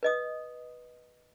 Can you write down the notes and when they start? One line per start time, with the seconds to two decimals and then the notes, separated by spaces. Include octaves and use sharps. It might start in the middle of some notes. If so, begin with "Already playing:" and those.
0.03 B4 D#5 D#6